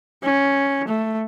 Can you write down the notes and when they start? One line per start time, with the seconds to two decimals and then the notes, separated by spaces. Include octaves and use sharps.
0.24 C#4
0.88 A3